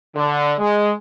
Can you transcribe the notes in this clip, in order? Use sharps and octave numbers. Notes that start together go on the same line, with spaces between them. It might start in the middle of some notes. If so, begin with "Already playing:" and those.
D3
G#3